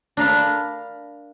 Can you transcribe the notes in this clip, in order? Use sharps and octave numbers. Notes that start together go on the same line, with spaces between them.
D4 A#4 F5 B5